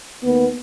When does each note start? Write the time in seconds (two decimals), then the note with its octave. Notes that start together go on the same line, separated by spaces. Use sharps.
0.24 D#2 D#3 B3